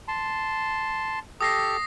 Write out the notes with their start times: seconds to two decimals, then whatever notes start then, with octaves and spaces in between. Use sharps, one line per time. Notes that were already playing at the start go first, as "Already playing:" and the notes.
0.08 A5 C6
1.41 G4 A4 D#6 A#6 C7